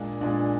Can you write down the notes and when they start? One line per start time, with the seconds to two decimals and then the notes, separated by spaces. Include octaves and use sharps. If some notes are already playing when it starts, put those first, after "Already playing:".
Already playing: A#2 G#3 D4
0.21 A#2 G#3 D4